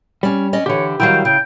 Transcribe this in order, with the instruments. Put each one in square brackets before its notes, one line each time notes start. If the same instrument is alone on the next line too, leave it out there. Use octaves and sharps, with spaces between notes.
[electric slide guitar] G3 [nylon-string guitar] C#4 D5
[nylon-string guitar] C#4 D5 D#5
[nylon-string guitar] D3 E3 [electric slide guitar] G4 [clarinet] C#5
[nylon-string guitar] D#3 F#3 G3 [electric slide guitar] E4 F5 [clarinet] G5
[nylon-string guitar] C#3 [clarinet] G5